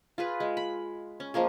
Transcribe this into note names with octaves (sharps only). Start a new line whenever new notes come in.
F4 G#4 B4
G#3
B5
C#4
F3 G#3 A#3 G#4